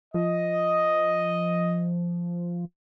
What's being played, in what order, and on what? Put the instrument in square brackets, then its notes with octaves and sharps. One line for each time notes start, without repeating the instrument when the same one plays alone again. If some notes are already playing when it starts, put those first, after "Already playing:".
[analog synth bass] F3 [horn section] D#5